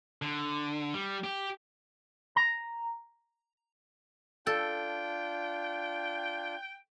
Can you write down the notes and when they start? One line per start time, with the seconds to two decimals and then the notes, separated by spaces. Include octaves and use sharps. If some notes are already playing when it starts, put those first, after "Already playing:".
0.22 D3
0.94 G3
1.24 G4
2.36 A#5
4.47 D4 F4 A4 G5